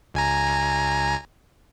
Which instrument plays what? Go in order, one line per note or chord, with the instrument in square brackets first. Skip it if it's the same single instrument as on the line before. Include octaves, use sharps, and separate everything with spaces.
[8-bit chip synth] C#2 G#5 A#5